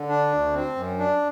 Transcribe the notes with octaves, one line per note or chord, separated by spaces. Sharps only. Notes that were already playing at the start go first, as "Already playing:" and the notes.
Already playing: D3
D4
D2
C4
F#2
D4